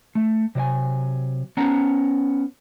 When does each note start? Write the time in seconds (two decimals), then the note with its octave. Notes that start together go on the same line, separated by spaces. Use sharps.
0.15 A3
0.55 C3 F#3 D5 G#5
1.57 B3 C#4 F#5 A5 A#5